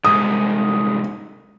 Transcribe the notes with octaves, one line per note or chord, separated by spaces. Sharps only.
C2 G#2 D#6